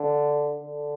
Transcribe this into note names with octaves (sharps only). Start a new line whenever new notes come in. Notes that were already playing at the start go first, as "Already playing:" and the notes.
Already playing: D3
D3